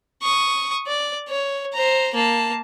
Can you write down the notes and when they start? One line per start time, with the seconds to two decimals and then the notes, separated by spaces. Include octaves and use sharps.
0.22 C#6 D#6
0.87 D5
1.29 C#5
1.74 C5 A#5
2.14 A#3 A5